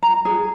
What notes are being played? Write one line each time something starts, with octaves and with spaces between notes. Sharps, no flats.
A#5
G#4